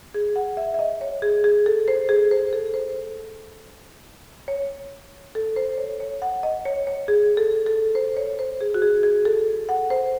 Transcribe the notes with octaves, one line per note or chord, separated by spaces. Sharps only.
G#4
F#5
E5
E5
D#5
C#5
G#4
G#4
A4
C5
G#4
C5
A4
C5
C#5
A4
C5
C#5
C#5
F#5
D#5
C#5
C#5
G#4
A4
A4
C5
C#5
C5
G#4
F#4
G#4
G#4
A4
F#5
C5